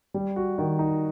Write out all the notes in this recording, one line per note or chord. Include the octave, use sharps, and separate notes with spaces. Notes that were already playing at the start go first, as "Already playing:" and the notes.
G3
F#4
D#3
D#4